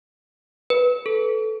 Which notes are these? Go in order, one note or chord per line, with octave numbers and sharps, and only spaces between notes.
B4
A4